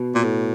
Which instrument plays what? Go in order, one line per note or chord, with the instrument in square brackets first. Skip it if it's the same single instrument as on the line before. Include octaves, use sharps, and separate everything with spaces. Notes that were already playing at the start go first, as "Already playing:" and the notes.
Already playing: [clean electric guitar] B2
[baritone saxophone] A#2
A2